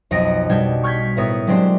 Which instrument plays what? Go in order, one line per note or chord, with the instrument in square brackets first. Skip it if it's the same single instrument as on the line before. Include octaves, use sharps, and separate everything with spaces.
[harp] B1 F2 D#4 D#5 A#6 D7
B2 G3 B3 D4 G6 G#6
C#6 F6 G6 G#6 B6
A2 B3 E4 A#4 C#5 D#6
F#3 G#3 C4 D4 G4 C5